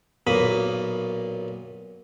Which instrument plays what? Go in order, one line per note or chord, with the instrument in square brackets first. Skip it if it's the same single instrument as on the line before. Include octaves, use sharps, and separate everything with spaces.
[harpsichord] B1 A#2 A#3 B5 D#6